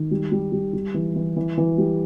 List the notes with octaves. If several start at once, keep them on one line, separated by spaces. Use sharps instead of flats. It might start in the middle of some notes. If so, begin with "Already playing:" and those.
Already playing: D#3
G3
G3
G3
G3
E3
E3
E3
E3
G3